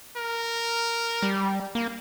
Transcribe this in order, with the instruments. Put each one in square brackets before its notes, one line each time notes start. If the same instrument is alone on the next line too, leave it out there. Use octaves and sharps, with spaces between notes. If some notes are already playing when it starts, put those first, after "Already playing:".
[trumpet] A#4
[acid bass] G3
A#3